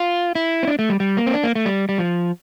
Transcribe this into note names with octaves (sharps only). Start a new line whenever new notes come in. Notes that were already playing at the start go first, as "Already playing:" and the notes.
Already playing: F4
E4
C4
D4
A3
G3
G3
A#3
C4
D4
A#3
A3
G3
G3
F3